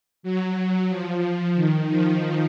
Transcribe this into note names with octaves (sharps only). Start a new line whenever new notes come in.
F#3
F3
D#3
F3